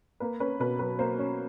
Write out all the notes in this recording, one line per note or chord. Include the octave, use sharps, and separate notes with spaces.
A#3 B4
C#4 B4
B2 B4
F#3 B4
A#3 C5
C#4